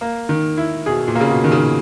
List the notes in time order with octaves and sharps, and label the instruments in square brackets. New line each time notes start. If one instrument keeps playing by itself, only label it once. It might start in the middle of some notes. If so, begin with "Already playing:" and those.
[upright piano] A#3
D#3
E4
[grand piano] B2 [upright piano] G#4
[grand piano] A#2
[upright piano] A#3
[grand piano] C#3
B2
[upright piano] D#3
[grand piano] C#3